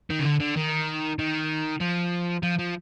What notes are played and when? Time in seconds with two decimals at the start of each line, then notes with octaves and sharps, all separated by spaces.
0.10 D#3
0.20 C#3
0.25 D3
0.40 D3
0.56 D#3
1.19 D#3
1.81 F3
2.43 F3
2.59 F3